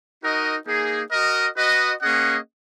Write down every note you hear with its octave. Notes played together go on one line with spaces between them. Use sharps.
D#4 F#4 A#4 D#5
A#3 D#4 G#4
F#4 A#4 D#5
F#4 B4 D#5
A#3 C#4 G#4 D#5 F#5